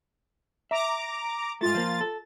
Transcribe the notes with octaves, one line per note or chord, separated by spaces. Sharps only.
E5 A#5 D6
G#2 A3 F4 A6
F3 A#3
A4